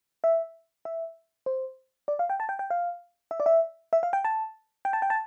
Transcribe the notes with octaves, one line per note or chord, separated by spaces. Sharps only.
E5
E5
C5
D5
F5
G5
A5
G5
G5
F5
E5
D5
E5
E5
F5
G5
A5
G5
A5
G5
A5